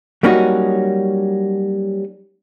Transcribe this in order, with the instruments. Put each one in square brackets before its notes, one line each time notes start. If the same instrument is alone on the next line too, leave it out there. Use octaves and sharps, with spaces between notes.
[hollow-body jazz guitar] F#3 G3 A#3 C#4 D#4 F#4